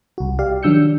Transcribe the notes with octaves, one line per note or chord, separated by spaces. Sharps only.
C2 F#4
G4 D5 F5
D#3 F#3 D4 E6 G6 C#7